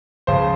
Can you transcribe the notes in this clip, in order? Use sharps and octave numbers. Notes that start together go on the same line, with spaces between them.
C#2 C#3 F3 C5